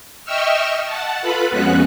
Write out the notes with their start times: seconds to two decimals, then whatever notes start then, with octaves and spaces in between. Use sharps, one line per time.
0.24 D#5 E5 G5 C#6 E6 F6
0.85 F#5 A5
1.22 F4 A4 B4 B5
1.50 F2 G#3 B3 C#4 F#4 F#6